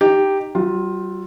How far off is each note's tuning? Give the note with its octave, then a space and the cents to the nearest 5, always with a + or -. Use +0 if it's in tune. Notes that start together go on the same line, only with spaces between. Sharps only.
D#4 -10 G4 +0
G3 -45 F4 +15